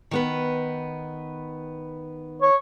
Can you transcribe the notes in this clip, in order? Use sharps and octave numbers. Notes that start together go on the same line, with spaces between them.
D#3 B3 B4
C#5